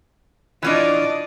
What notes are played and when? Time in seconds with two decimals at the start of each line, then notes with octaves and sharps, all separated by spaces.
0.63 E3 C#4 D4 F4 D5 D#5